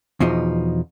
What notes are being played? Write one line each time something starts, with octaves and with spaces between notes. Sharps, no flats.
E2 B2 F3 D#4